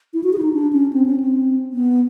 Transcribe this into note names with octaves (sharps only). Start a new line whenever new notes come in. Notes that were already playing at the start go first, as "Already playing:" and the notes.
E4
F#4
G#4
E4
D#4
D4
C#4
C4
C#4
C4
B3